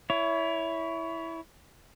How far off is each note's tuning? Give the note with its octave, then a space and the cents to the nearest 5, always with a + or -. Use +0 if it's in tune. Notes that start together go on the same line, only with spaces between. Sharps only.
E4 +0 C#5 +25